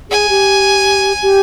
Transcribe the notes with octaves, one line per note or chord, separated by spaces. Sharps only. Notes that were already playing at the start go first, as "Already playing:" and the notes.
G#4 G#5
G4
G4